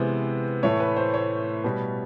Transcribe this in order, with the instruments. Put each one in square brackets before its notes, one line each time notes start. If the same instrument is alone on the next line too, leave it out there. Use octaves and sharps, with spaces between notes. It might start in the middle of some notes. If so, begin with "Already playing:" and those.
Already playing: [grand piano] C3 E3 G#3 B3 C5
A2 E3 A3 C#5
B4
C5
C#5
B2 G3 B3